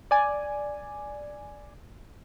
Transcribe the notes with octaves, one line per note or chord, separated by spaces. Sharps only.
D5 G#5